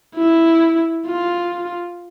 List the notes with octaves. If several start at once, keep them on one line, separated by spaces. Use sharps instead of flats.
E4
F4